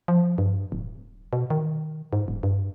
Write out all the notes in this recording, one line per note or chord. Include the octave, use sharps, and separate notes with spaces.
F3
G2
D1
B2
D#3
G#2
D#1
G2